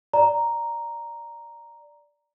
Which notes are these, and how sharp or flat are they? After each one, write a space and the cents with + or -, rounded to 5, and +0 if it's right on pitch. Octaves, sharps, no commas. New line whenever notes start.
D5 +0 A#5 +0